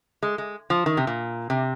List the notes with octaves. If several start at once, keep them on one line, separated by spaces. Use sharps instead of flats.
G#3
G#3
F3
D#3
C3
A#2
C3